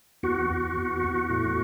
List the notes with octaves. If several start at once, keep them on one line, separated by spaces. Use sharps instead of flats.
E2 F#4
E2
E2
E2
A2